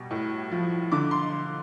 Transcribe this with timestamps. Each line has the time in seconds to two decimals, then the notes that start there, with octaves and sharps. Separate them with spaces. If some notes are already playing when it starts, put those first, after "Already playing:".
Already playing: B2 G3
0.11 A2
0.51 F3
0.92 D3 D6
1.11 C6